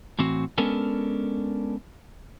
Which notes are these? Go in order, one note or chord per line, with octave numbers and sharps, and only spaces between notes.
A2 E3 C4 F#4
G#3 B3 C#4 D4 A4 A#4